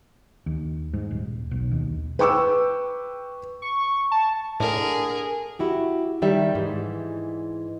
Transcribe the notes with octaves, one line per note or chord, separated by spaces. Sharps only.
D#2
G#2
D#1
B1
D#2
B4 G5 C#6 D6 E6
C#6
A5
A2 D3 G#4 A#4
E4 F#4 G4
D#3 G3 E5
G#2 E3